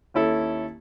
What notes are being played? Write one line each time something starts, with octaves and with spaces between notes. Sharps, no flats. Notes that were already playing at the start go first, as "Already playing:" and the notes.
D#2 C#4 E4 A4